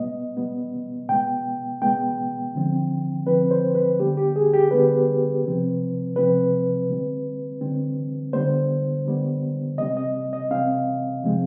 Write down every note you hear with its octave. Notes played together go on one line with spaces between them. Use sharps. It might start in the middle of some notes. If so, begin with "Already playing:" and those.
Already playing: B2 G3 B3 D#5
B2 G3 B3
B2 G#3 B3 G5
B2 G#3 B3 G5
D3 F3 C4
D3 F3 C4 B4
C5
B4
D3 G3 B3 G4
G4
G#4
G4
D3 G3 B3 B4
C3 F3 C4
C3 F3 C4 B4
D3 G3 C4
D3 G3 C4
D3 G3 B3 C5
D3 G3 B3
C3 G3 C4 D#5
D#5
D#5
C3 G3 C4 F5
C3 F3 G#3 C4